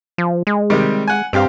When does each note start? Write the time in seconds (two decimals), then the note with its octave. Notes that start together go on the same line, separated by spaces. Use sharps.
0.18 F3
0.47 G#3
0.70 C3 D#3 G3
1.08 F#5 G#5
1.33 G2 C4 G4 F5